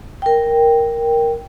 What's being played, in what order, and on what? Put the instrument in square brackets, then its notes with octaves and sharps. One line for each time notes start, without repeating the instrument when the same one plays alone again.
[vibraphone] A#4 G5